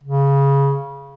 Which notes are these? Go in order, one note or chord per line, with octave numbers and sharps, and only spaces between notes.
C#3